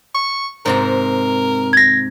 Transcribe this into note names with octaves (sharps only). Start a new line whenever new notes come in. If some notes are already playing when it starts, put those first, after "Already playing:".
C#6
G#2 C3 A#4 A#5
G#6 A#6